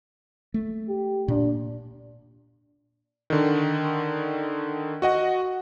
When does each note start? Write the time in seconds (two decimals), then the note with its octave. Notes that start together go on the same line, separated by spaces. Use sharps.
0.54 A3
0.89 G4
1.28 A#2 D4
3.30 D3 D#3
5.02 F#4 D#5 F#5